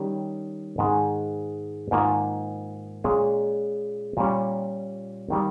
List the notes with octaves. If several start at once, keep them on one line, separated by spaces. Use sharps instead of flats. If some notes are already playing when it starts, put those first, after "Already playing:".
Already playing: D#3 G3 C#4 G4
G#2 D#3 G#3
G#2 D#3 A#3 F4
A#2 G#3 C#4 G#4
A#2 G3 C#4
D#3 G3 A#3